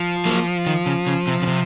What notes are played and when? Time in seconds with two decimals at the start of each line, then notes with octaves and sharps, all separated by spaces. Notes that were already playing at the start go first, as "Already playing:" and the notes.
Already playing: F3
0.25 F#3 A#3
0.67 D#3
0.86 C#3
1.07 C#3
1.27 C3
1.42 C#3
1.47 C3